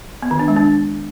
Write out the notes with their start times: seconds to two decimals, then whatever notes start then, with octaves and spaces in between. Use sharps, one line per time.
0.23 B3
0.31 D#3
0.39 D4
0.48 G#3
0.56 D4